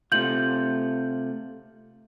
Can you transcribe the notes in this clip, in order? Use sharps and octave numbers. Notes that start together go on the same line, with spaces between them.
C3 A3 F4 G6 F#7